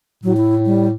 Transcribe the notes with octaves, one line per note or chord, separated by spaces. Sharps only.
A2 F#3
E4
G3